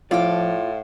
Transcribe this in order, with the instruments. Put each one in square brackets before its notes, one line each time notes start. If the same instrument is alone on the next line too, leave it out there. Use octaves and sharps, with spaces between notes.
[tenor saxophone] A2 [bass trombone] F3 [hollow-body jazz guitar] E4 F4 D5 [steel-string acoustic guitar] F5 G5